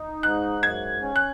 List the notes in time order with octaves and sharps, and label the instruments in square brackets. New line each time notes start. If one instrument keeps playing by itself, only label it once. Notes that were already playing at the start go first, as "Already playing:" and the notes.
Already playing: [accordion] D#4
[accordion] G#2 [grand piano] F#6
[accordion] F#2 [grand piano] G#6
[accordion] C#4
[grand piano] F#6